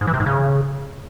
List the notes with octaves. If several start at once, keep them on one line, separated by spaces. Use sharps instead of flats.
G#2
E3
C3
G#2
C#3